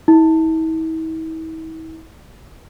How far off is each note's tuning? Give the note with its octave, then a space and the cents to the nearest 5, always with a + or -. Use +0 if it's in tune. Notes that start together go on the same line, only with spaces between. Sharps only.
E4 -45